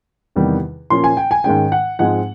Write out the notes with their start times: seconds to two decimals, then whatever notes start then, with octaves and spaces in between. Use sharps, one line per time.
0.36 E2 C3 D#3 G3
0.90 A#2 F3 A#3 C#4 C6
1.04 G#5
1.17 G5
1.31 G#5
1.44 G#2 D#3 G#3 C#4 G5
1.72 F#5
1.99 G#2 F3 G#3 C4 F#5